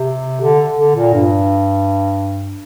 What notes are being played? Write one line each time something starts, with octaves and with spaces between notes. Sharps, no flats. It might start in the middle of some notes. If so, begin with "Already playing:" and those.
Already playing: C3
D3
D3
A#2
G2